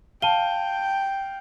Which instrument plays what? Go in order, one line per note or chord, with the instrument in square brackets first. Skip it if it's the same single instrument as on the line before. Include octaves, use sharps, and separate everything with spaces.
[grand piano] F5 [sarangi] G5 [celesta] A5 D#7 G7